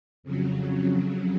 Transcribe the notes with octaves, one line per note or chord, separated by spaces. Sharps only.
F2 C#3 F#3